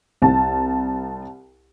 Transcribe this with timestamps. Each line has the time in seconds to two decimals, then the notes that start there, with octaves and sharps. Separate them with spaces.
0.22 C2 A5